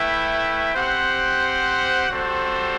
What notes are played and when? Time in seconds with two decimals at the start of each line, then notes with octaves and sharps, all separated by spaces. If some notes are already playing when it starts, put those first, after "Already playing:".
Already playing: A3 E4 B4 E5 G5
0.74 C4 G4 C5 F#5
2.09 G3 C4 F#4 A4 C5